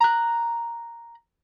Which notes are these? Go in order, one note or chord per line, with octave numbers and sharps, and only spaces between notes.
A#5 F#6